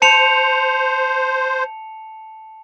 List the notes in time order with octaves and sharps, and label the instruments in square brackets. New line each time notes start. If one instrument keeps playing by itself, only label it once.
[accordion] C5 [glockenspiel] A5 C#7 F7